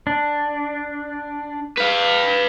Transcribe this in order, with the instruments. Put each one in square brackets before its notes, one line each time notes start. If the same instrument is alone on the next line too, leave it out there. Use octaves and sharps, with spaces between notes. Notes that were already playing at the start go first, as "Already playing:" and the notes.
[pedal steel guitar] D4
[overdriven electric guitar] B4 F5